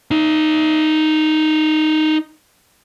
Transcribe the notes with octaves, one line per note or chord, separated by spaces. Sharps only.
D#4 E5